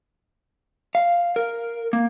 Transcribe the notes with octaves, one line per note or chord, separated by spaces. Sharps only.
F5
A#4
A#3